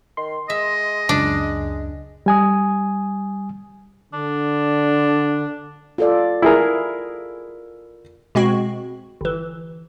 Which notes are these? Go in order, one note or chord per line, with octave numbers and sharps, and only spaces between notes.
D#3 C6
G#3 D#5 E5
C#2 F#2 D4
G3 G#5 D#6
D3 D4
F4 A4 D5
E4 G#4 A#4
B2 G#3 C4 F#4
G1 E3